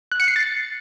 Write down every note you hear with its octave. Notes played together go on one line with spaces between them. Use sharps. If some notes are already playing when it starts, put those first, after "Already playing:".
F#6
C#7
C7
A6